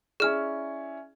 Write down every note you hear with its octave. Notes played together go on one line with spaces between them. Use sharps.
C#4 E4 G#4 D5 F6